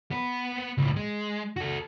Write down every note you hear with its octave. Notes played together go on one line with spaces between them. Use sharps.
B3 B4
C#2 A2
G#3
F#4 A4